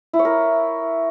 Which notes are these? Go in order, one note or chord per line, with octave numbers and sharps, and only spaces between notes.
E4
C#5
A#4